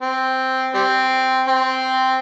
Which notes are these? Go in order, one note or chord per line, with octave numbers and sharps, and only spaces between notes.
C4
G3 C4
C4